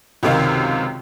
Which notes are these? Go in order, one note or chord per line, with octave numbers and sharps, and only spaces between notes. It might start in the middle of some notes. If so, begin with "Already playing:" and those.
C#2 F#2 C3 D#3 F5